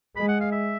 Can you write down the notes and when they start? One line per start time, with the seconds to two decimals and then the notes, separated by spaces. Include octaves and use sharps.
0.16 G#3 B5
0.28 F#5
0.40 F5
0.52 E5